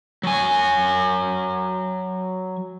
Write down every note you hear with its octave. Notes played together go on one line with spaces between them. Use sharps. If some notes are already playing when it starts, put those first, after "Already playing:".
F#3 G#5